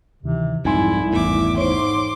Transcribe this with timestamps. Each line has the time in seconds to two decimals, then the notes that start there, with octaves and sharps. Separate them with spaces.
0.23 D2 C3 D#3 E3
0.65 C2 F2 G#2 D#4 E4 G#5 C6
1.13 G#1 E2 A2 E5 D6
1.58 G#2 C5 C#5 C6 D6